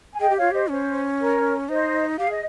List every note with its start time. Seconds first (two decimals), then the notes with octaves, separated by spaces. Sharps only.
0.13 G#5
0.20 G#4 D#5 G5
0.30 G4
0.37 F4 C#5 F5
0.51 G4 C5 D#5
0.70 C#4 C5
1.19 A#4 C#5
1.69 D#4 C5 D#5
2.18 G4 F5
2.27 G#4
2.31 D#5